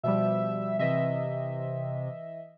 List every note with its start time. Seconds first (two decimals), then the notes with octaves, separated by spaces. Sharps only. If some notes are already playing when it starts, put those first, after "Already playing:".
0.03 B2 F3 G3 E5
0.79 C3 E3 D#5 E5